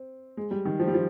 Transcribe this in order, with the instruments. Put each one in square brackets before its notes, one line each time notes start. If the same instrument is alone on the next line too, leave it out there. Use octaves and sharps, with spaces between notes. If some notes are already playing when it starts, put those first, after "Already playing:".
Already playing: [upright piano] C4
G#3
G3
D#3
F3
G3
F3